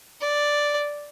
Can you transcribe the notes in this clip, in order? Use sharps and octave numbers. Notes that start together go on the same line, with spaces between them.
D5